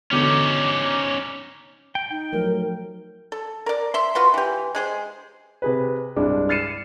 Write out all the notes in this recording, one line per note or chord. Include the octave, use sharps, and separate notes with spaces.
E2 B2 D3 C#4 D#4 D6
G5
D#4 G5
F3 F#3 A3 A#4
A4
A#4 D5
E5 C6
F4 F#4 B4 C6
E3 G4
G#3 G#4 C5
C3 G#4 B4
C2 G2 C3 G#3 D4 D6
F6 A6 C7 C#7 D#7 E7